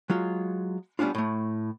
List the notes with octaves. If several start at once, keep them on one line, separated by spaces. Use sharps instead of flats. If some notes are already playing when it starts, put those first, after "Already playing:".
F#3 G#3 F4
G3 B3 C#4 D4 F4
A2 A3